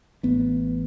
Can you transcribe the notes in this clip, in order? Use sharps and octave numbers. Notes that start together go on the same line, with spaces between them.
A1 B3